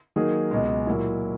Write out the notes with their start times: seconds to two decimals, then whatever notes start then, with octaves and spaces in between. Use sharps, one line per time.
0.16 D#3 F#3 A#3 D#4 G#4
0.51 C#2 B2 G#3
0.87 A#2 F#3 A#3 E4